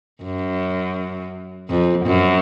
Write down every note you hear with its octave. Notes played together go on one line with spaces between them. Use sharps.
F#2
F2
F#2